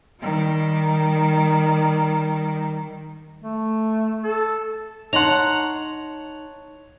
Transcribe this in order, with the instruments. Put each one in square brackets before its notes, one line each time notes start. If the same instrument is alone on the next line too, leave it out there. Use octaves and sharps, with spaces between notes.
[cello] D#3 G3
[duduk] A3
A4
[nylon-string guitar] D#4 [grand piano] C#5 A5 C6 [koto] F#5 A#5 [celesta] F7 F#7